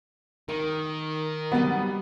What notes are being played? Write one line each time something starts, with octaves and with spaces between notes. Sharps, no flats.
D#3 A#4
F#3 G3 B3